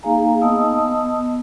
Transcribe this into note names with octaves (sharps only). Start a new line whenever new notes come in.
A#3 D#4 G#4 F5 G#5 A#5
B3 D#5 A5 D#6 E6